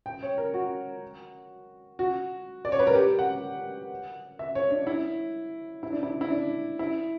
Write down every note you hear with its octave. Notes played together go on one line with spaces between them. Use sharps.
G5
C#5
A#4
F#4
F#4
D5
C#5
B4
A#4
G4
F#5
E5
C#5
D4
E4
E4
D4
E4
E4
D4
E4